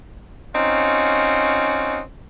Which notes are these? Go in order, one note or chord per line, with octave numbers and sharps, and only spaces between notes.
C4 C#4 D#4 F4 F#4